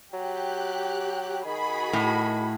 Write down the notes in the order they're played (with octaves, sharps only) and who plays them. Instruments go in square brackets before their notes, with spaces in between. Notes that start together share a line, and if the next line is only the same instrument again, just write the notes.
[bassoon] F#3 [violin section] G4 F#6
[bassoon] D#3 [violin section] F#4 G#4 B5
[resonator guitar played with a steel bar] A2